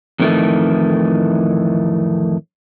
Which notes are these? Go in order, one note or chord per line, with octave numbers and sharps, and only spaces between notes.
F2 A2 D#3 E3 A3